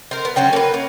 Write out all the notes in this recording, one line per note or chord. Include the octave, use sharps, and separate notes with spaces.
A#4 C5
B3
D3 F#3 C#4 G5
A#3 B4
C#4